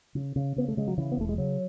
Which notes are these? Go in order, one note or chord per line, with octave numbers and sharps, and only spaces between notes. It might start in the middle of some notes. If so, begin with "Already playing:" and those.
C#3
C#3
C#3 B3
A3
C#3 G#3
F#3
C#3 E3
B3
E1 A3
G#3
C#3 F#3